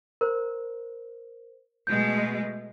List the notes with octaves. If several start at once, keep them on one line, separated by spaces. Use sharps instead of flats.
A#4 C5
B2 G#3 A3 G6